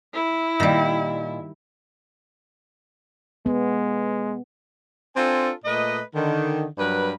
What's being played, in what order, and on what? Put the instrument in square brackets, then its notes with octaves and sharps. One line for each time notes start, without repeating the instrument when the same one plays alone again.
[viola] E4
[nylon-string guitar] A#2 D#5 F5 [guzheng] D#3 G3
[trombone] G#3 [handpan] B3
[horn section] C4 D4 F4 A4 G#5
A#2 A3 B4 D#5
D3 D#3
G2 F#3 A#4 B4